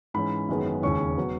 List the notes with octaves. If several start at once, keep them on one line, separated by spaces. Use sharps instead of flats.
G#2 E3 G#3 C#4 B5
F#1 F#2 D#3 G#3 B3
E1 D#2 C#3 G#3 C#4 C#6
F#3 B3